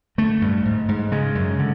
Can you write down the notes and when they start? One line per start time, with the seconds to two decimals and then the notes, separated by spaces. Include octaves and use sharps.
0.18 D3 A3
0.42 G2
0.65 G#2
0.89 G#2
1.11 C#3 G#3
1.35 F#2
1.59 D3